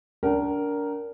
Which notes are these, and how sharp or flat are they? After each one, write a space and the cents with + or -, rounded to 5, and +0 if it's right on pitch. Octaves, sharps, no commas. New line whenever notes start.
D4 -30 A#4 +0 F#5 +45